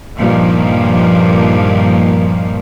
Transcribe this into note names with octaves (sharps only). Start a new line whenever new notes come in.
G2 A#2 D#3 F3 A#3